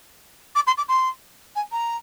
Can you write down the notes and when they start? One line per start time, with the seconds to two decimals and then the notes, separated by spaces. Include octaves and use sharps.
0.55 D6
0.67 C6
0.77 D6
0.88 C6
1.55 G#5
1.72 A#5